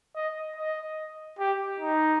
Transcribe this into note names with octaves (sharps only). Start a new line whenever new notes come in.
D#5
D#5
G4
D#4